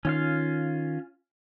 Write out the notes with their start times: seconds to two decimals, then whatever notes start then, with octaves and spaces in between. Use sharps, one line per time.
0.05 D#3 C#4 F4 F5